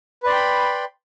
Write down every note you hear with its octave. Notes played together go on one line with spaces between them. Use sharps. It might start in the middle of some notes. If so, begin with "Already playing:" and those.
B4 D5 G5 B5 C6